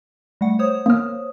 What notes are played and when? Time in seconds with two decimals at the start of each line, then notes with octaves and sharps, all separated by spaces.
0.41 G3 A3 F#5
0.59 C5 C#5 D#6
0.86 A#3 F6